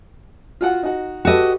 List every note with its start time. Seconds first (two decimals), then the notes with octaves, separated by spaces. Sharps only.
0.61 F4 F#4 F#5
0.83 D#4 F#4
1.25 F#4 G4 A4 B4 D#5